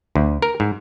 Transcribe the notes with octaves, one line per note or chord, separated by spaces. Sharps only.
D2
A#4
G#2